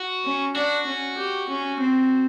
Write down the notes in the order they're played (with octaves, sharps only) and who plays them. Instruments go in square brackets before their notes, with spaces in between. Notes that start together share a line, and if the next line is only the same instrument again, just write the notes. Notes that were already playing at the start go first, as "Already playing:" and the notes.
Already playing: [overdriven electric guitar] F#4
[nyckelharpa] C#4
[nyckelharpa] D4 [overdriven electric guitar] F#4
[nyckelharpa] C#4
G4
C#4
C4